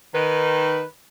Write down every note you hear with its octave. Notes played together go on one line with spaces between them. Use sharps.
D#3 B4